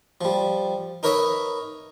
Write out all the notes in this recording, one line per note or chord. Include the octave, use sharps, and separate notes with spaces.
F3 G3
D#4 A#4 B4 C#5 D#5 E5